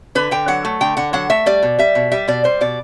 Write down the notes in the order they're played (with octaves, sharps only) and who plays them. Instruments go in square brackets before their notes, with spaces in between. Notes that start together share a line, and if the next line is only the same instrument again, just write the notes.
[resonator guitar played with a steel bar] D3 B4
D3 G5
F#3 F#5
A3
D3 G5
D3 F#5
F#3 F#5
A3 E5
G3 D5
B2
G3 E5
B2
G3 E5
B2 D5
G3 C5
B2 D5